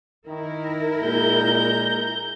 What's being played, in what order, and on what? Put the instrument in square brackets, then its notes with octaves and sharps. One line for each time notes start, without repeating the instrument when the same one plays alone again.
[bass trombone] D#3 [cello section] E4 A#4
[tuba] A#2 [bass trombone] G#3 [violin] A#5 G6